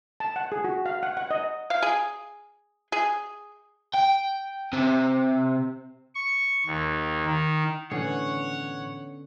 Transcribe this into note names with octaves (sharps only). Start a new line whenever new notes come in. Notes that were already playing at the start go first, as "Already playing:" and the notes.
A5
F#5
G#4
F#4
F5
F#5
F#5
D#5
F5
G#4
G#4
G5
C3
C#6
D#2
D#3
A2 D3 E3 B3 C#4 C#5 F#5 C7